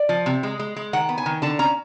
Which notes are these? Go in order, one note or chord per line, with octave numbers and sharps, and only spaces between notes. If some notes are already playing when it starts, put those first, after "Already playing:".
Already playing: D5
F3
C3
G#3
G#3
G#3
D#3 F#5
B3
G#5
D#3
D3 A5
C#4 A#5